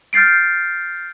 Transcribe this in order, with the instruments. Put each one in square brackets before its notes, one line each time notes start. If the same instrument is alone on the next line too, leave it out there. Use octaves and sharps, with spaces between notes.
[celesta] F6 G6 A6 C7 D7